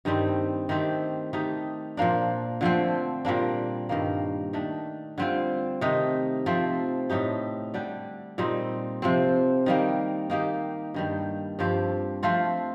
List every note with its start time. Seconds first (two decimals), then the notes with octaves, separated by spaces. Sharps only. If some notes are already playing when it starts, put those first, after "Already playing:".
0.05 G2 D#3 G3 C4
0.69 D#3 A3 C4 G4
1.33 D#3 A3 D#4 G4
1.97 A#2 F3 A#3 D4
2.61 D3 F3 A3 C4
3.25 A#2 G3 A#3 D4
3.89 G2 D#3 A#3
4.53 D#3 A3 D4
5.18 D3 G3 C4 F4
5.81 C3 D#3 A3 D#4
6.46 F3 A3 C4
7.10 A2 A3 D#4 G4
7.74 D3 G3 D4 G4
8.38 A#2 G3 C4 D#4
9.02 C3 F3 C4
9.66 D#3 G3 A#3
10.30 D#3 A#3 D#4 G4
10.94 G2 D#3 G3
11.59 G2 F3 C4 G4
12.23 F3 A3 C4 F4